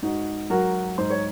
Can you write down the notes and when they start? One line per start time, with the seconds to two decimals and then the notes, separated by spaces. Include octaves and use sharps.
0.02 G#2 D#4 F#4
0.50 F#3 F#4 A#4
0.98 G#2 C5
1.10 C#5